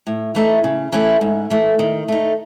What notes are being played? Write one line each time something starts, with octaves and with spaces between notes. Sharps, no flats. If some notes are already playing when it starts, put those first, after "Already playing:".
A2
E3 A3 D#4
C#3
E3 A3 C#4 E4
G#2
E3 A3
D#3
A3 D#4